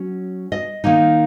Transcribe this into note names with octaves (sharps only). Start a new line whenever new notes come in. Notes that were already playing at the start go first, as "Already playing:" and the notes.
Already playing: F#3 C#4
D#5
D#3 A#3 D#4